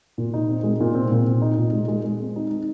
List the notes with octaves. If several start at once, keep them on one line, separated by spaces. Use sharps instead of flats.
A#2
D#4
C4
G#3
A#2
C4
A#2
C4
D#4
A#2
G#3
G#3
G#3
C4
D#4
D#4